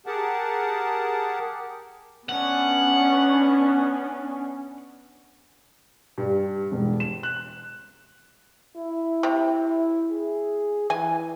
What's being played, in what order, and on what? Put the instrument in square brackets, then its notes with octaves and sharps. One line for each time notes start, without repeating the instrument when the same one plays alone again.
[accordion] G4 G#4 A#4 F#5 A5
[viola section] B3 C#4 D4 [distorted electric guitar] F#5
[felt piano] G2
E1
E7
F#6
[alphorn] E4
[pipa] C3
[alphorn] G#4
[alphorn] E3 [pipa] G#5